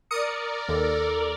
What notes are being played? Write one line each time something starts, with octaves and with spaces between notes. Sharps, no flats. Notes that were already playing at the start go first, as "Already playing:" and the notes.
A#4 D5 D#6 C#7
D#2 A4